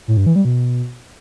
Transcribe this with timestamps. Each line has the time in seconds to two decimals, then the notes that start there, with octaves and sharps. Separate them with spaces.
0.08 A2
0.17 G2
0.26 E3
0.36 G3
0.45 B2